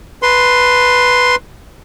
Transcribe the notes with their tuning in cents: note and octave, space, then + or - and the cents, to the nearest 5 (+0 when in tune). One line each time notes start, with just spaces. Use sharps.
B4 +0 A5 +30 C6 +0